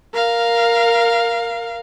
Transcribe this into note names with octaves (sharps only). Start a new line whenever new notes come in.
A#4 F5